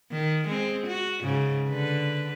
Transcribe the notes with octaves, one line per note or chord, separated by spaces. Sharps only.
D#3
G#3 C4
F#4
G#2 C#3
D3 B4